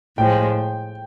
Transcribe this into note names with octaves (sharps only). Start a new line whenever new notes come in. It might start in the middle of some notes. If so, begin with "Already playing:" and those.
A2 F3 G#3 G5